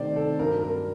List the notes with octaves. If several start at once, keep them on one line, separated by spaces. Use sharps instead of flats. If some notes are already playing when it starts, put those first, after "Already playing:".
Already playing: C3 D#3 A3 C4 C5 D5
A4
G2 F#3 C4 A#4
A#4